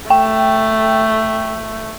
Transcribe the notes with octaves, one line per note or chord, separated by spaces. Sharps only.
A3 G5